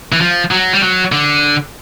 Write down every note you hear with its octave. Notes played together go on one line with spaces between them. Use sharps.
E3
F3
F#3
G3
F#3
D3